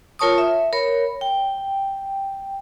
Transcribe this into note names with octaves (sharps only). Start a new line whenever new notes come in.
F4 A#4 C#5 A5 C#6 D#6
E5
A#4 C#5 B5
G5